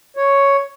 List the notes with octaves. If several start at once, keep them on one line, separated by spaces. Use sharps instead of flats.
C#5